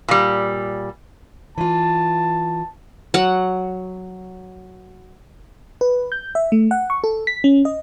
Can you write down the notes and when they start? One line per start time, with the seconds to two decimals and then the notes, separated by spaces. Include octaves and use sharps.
0.08 A#2 G3
1.58 E3 F4 A5
3.14 F#3 F#5
5.81 B4
6.12 G6
6.35 E5
6.52 A3
6.71 F#5
6.90 C#6
7.04 A4
7.27 B6
7.44 C#4
7.65 D#5